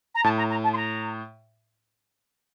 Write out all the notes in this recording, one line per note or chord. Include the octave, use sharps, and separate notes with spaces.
A#5
A2 A5
A#5
A#5
A5
C6
A#5